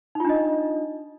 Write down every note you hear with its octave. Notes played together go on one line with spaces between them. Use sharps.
D4 D#4 F4 D#5